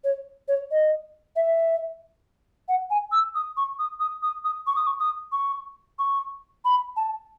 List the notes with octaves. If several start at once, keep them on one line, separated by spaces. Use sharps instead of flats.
C#5
C#5
D#5
E5
F#5
G#5
E6
D#6
C#6
D#6
D#6
D#6
D#6
C#6
D#6
C#6
D#6
C#6
C#6
B5
A5